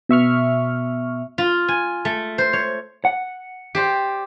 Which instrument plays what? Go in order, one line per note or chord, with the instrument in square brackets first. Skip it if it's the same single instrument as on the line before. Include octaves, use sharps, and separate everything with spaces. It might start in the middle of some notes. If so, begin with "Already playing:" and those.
[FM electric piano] B2 E5 C#6 F6
[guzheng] F4
G#5
A3
C5
C#5
[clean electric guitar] F#5
[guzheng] G4 C5 D5